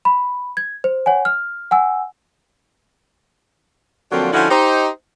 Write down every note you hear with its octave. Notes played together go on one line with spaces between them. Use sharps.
B5
G#6
C5
C#5 F#5 G#5
F6
F#5 G#5 E6
D3 F3 F#3 A#3 C4 D4
D3 F3 C#4 D#4 E4 F#4
D#4 G4 C5